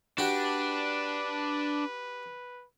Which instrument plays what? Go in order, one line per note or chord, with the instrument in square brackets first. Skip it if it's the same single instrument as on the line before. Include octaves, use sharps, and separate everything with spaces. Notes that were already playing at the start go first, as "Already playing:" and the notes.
[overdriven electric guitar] D4 [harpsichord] F#4 G4 [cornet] B4